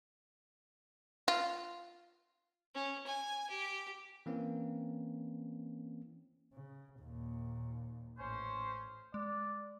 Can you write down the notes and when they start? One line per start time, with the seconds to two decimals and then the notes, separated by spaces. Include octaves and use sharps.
1.28 F4
2.74 C#4
3.06 G#5
3.50 G4
4.26 E3 A#3 C4 C#4
6.53 C#3
7.00 D#2 A#2
8.18 A1 C#4 C5
9.14 G#3 D5